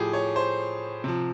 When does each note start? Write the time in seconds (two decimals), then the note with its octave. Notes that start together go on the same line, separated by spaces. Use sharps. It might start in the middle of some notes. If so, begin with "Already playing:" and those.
Already playing: A2 F3 G4 G#4
0.13 C#5
0.36 C5
1.04 C3 F3